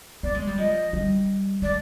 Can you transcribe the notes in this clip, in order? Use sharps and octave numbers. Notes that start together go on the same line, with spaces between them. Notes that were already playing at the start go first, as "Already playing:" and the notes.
B3 D5
G#3
G3
F3 D#5
G3
G#3 D5